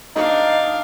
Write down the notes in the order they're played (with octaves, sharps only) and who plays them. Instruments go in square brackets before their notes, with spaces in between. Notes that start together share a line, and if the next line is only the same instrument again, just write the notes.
[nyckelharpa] D4 F5 [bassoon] D#4